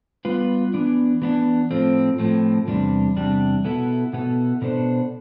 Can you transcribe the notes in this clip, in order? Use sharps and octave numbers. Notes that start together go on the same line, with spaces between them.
G3 B3 F4 B4
E3 B3 D4
E3 B3 D4
A2 F3 A3 C4
A2 F3 A3 C4
E2 C3 G3 D4
E2 C3 G3 D4
B2 B3 E4 A4
B2 B3 E4 A4
B2 B3 D4 A4 C5